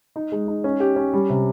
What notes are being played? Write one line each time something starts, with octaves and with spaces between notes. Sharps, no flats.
D#4
G#3
D#4
C#4
G4
C#4
G3
C3